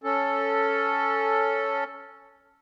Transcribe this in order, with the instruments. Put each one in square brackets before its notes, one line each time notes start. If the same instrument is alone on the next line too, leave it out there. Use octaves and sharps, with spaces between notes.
[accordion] C#4 A4